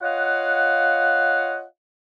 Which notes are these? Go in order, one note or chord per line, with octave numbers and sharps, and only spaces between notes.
F4 C#5 D#5 F5 F#5